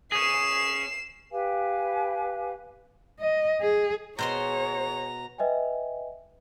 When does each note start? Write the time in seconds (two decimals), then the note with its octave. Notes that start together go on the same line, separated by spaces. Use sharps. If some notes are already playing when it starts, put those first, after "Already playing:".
0.12 C#4 G#4 C7 E7
1.31 G4 B4 F5 G#5
3.20 D#5
3.61 G#4
4.19 B2 G#4 C5 C#5 A#5 C6
5.38 B4 D#5 E5 G5 G#5